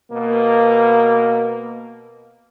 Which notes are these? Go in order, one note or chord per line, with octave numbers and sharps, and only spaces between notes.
B2 A#3